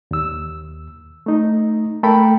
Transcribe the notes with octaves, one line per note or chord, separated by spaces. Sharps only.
D#2 E6
A3 D#4
A3 A4 A#4 G5 B5